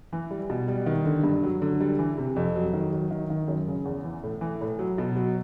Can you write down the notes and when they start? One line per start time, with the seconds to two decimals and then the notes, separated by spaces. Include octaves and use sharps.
0.13 E3
0.31 G3
0.50 B2
0.68 G3
0.86 D#3
1.05 D3
1.24 G2
1.43 F#3
1.62 D3
1.80 G3
1.99 E3
2.18 C3
2.36 F2
2.55 F#3
2.73 D#3
2.93 F#3
3.11 D#3
3.30 D#3
3.48 F#2
3.68 C#3
3.85 E2
4.05 E3
4.23 A2
4.41 E3
4.61 A2
4.79 F#3
4.98 B2
5.16 F#3